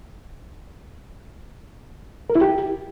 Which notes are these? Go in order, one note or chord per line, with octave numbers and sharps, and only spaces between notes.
A#4
E4
G4